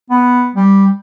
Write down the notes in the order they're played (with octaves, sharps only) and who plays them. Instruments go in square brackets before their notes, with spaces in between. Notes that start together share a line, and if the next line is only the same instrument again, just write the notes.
[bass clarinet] B3
G3